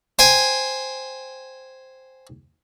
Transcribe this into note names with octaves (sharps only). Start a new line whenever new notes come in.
C5 G5 G#5